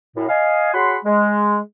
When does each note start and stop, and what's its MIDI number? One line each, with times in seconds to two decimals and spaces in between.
0.16 0.26 42
0.16 0.26 45
0.29 0.72 75
0.29 0.72 77
0.29 0.72 80
0.73 0.97 66
0.73 0.97 68
0.73 0.97 73
0.73 0.97 78
0.73 0.97 83
0.73 0.97 84
1.05 1.59 56